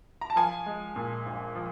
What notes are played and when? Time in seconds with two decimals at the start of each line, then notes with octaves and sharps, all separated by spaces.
0.21 A#5
0.30 A5
0.36 F3 G#5
0.66 G#3
0.96 A#2
1.26 A#1
1.55 F3